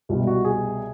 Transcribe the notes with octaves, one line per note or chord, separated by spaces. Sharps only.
C2 B2 G3 F4
F#4
G#4